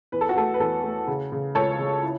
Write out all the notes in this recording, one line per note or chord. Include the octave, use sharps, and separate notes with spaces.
E2 B4
A4
F#4
A3 A4
B4
E2 A4
A3
C#3
C#3
C#2 A4 C#5
C#3
E4